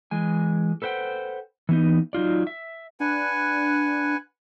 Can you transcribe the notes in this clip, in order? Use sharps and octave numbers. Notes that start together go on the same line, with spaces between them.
E3 G#3 G#5
A4 B4 C5 F#5 G5
E3 B3 D#4
F#3 D#4 F4 D5
E5
D4 B4 F#5 G#5